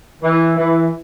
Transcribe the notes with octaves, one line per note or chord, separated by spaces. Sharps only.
E3
E3